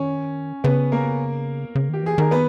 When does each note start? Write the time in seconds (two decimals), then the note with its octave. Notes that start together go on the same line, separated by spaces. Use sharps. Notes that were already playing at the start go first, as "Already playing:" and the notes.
Already playing: D#3 C#4
0.64 C#3 B3 B4
0.92 A#3 A#4
1.75 C#3
1.89 D#3 G4
2.03 E3 G#4
2.18 D#3 A#4
2.31 B3 B4